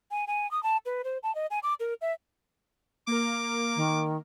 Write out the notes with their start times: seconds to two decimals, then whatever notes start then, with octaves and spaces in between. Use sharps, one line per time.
0.11 G#5
0.27 G#5
0.51 D#6
0.63 A5
0.86 B4
1.04 C5
1.23 A5
1.35 D#5
1.51 G#5
1.63 D6
1.80 A#4
2.01 E5
3.07 A#3 A#4 D6
3.76 D#3